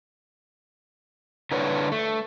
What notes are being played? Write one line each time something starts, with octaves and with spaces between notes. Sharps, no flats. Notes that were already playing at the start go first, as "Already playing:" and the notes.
D3 D4 E4 B4 C#5
A3